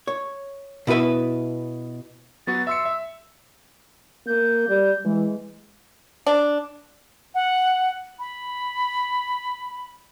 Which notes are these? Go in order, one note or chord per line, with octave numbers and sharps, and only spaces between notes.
C#5
B2 E4 A4 B4 E5
F#3 B3 F#4 A6
E5 C6 E6 C#7
E5
A#3 G6
G3
E3 G#3
D4
F#5
B5